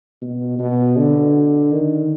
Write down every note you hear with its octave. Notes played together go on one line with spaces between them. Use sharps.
B2
B2
D3
D#3